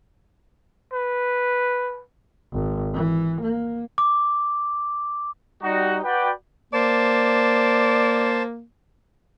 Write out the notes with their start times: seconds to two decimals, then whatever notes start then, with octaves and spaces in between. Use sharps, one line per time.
0.93 B4
2.52 G#1
2.94 E3
3.41 A#3
3.98 D6
5.63 G3 D#4 F#4
6.04 F#4 B4 D5 G5
6.73 A#3 C5 D5 A5